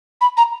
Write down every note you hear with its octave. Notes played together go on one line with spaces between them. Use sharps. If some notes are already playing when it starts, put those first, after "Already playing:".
B5
A#5